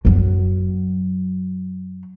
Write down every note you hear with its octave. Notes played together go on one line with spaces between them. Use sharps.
F#2 F#3